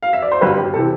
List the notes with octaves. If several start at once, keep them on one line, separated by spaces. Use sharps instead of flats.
F5
E5
D5
C5
G1 G4 B4
G4
C3 E3 A4